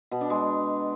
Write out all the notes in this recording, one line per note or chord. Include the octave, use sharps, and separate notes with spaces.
B2
D4
G#3